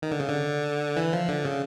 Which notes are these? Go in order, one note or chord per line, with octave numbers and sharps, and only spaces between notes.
D#3
D3
C#3
D3
E3
F3
D3
C#3